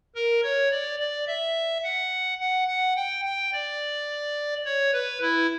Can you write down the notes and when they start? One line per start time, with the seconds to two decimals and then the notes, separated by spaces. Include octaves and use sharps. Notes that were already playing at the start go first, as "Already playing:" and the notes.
0.15 A#4
0.43 C#5
0.71 D5
0.99 D5
1.27 E5
1.84 F#5
2.40 F#5
2.68 F#5
2.96 G5
3.25 G5
3.53 D5
4.65 C#5
4.93 B4
5.21 E4